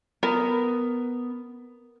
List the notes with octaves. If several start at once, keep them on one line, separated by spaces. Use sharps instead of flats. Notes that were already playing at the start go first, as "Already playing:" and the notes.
B3 A#4